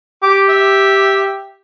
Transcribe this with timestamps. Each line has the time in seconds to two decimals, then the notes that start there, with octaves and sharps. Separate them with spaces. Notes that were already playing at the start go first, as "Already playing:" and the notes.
0.23 G4 D6
0.49 E5